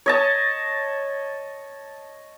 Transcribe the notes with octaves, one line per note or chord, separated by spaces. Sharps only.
C#5 D#5 A5